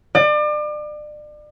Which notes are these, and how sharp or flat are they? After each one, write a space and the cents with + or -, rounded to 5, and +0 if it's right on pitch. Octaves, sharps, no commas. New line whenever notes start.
D5 +35